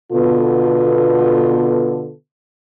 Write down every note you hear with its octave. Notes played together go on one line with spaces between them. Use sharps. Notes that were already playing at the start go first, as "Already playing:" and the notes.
B2 D3 B3 F4 A4 B4